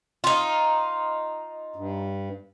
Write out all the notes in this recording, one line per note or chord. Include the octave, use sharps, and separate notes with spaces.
D#4 F4
G2